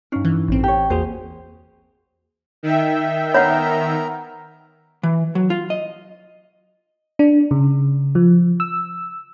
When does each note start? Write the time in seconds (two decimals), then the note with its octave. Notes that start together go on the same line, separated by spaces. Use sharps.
0.12 G2 C#4 D#4
0.25 E3
0.48 A1 C4
0.64 G4 C#5
0.90 E2 A#3 F#4 G#4 C5
2.63 D#3 E5 G5
3.34 B3 A#4 C#5 F#5 A#5
5.03 E3
5.35 F#3
5.50 F4
5.70 D#5
7.19 D4
7.51 C#3
8.15 F3
8.60 E6